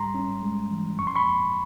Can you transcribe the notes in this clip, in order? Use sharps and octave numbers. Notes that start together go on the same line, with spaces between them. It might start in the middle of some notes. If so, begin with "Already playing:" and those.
Already playing: G#2 G3 A#5 C6
C#4
G#3
E3
F2 C#6
C6
B5 C#6
F2